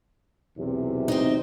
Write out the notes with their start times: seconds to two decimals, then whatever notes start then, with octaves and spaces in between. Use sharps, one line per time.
0.58 B1 E2 C3
1.08 C4 D#4